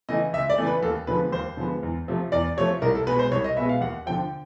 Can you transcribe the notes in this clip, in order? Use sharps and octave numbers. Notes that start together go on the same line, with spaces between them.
C#3 E3 A3 D#5
C#2 E5
D5
C#3 E3 A3
B4
D#2 A4
D3 F3 G#3 B3 B4
D#2 C5
D3 F3 G#3 B3
E2
C3 F3 A3
E2 D5
C3 F3 A3 C#5
C2 A#4
A4
B2 G#3 B3 B4
C5
C2 C#5
D#5
B2 G#3 B3 E5
F5
D#2 F#5
D3 F3 G5